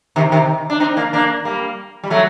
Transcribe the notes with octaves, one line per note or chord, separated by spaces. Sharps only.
C3 D#3
C3 D#3
D4
C4 D#4
A#3 D4
A#3 D4
G3 A#3
G3
F#3 A3